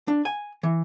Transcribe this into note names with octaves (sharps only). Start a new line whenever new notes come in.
D4
G#5
E3